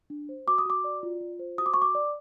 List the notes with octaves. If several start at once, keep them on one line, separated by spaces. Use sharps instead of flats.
D4
C5
F#4 D6
D#6
F#4 D6
D5
F4
F4
C5
F#4 D#6
D6
C#6
F#4
D6
D5